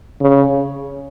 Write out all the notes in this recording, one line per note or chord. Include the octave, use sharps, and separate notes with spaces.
C#3